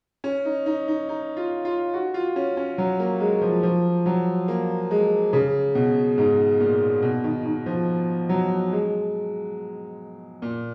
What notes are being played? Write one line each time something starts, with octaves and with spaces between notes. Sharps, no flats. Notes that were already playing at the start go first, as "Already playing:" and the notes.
C#4
D#4
D#4
D#4
D#4
F4
F4
F#4
F4
C#4
C#4
F#3
A#3
G#3
F3
F3
F#3
A#3
G#3
C#3
B2
G#2
A#2
B2
D#3
D#3
F3
F#3
G#3
A#2